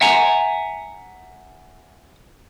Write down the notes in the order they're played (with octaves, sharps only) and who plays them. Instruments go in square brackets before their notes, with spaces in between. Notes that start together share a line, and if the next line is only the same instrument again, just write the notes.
[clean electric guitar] E5 F#5 G#5 A#5